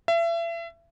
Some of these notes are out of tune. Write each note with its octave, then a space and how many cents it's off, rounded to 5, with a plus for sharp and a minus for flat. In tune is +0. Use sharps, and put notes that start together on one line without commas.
E5 +35